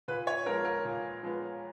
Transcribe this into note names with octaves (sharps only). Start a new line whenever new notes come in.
A#2 B4
C#5
F3 G#3 B3 A#4
A#4
A#2
F3 G#3 B3